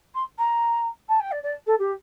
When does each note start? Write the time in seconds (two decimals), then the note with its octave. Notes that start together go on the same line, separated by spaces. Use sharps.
0.14 C6
0.38 A#5
1.08 A5
1.20 G5
1.31 D5
1.43 D5
1.66 A4
1.78 G4